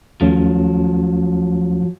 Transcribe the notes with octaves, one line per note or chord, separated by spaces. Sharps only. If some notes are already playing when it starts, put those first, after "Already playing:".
D#2 F3 F#3 A3 C#4